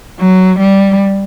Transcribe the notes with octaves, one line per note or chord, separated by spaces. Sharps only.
F#3
G3